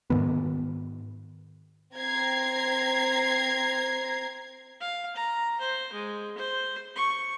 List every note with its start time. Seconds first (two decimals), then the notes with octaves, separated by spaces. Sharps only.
0.10 G#2 D#3 B3
1.94 C4 A#5 G#6 C7
4.80 F5
5.15 A#5
5.60 C5
5.92 G#3
6.37 C5
6.96 C#6